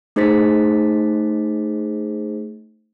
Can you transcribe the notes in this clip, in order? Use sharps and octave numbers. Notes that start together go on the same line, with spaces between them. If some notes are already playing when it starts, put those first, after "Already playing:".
A3 D#4 G#4 C5 A6 B6